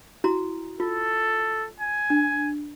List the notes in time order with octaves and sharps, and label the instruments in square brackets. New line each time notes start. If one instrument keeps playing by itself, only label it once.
[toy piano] E4 F#4 A#5
[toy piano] F4 [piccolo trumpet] A4
[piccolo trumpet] G#5
[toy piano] D4